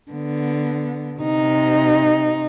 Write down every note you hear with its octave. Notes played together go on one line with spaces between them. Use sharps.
D3 B3
C3 D#4